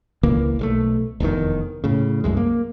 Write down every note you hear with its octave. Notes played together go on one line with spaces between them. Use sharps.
C#2 E3 A#3
B1 G3 A3
F1 E2 G2 D#3
A2 C#3
C2 F#2 G#3
A#3